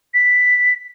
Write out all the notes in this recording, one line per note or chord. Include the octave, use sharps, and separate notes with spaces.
B6